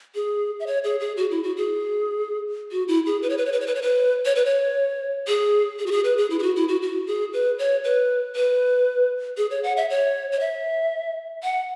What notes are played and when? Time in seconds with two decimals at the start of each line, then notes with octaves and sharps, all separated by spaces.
0.15 G#4
0.60 E5
0.67 C#5
0.84 G#4
1.00 G#4
1.17 F#4
1.31 E4
1.43 F#4
1.57 G#4
2.72 F#4
2.88 E4
3.06 G#4
3.22 B4
3.30 C#5
3.38 B4
3.46 C#5
3.52 B4
3.60 C#5
3.67 B4
3.75 C#5
3.82 B4
4.25 C#5
4.35 B4
4.45 C#5
5.28 G#4
5.79 G#4
5.86 F#4
5.92 G#4
6.04 B4
6.18 G#4
6.30 E4
6.39 G#4
6.43 F#4
6.56 E4
6.68 F#4
6.82 F#4
7.07 G#4
7.33 B4
7.59 C#5
7.84 B4
8.36 B4
9.37 G#4
9.51 C#5
9.64 F#5
9.77 E5
9.90 C#5
10.32 C#5
10.40 E5
11.43 F#5